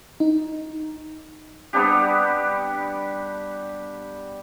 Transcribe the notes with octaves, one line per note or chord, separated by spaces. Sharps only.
D#4
G3 B3 D4 G4